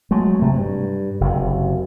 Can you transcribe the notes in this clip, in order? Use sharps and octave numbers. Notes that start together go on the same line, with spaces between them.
F#3 G#3 A3
C3 A3
G2
F#1 C3